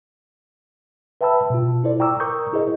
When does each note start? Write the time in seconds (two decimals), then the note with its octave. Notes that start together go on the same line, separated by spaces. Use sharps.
1.21 B4 E5 G5 A5 B5 E6
1.50 B2 F4
1.84 E4 A4 C5 D5
2.00 G5 A#5 C#6 D6 E6
2.20 A#4 A#5 C#6 D#6 G6
2.53 E4 G#4 A#4 C5 D#5